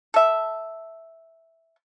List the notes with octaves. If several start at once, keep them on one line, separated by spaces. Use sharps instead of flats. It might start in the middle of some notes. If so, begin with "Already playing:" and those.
A4 E5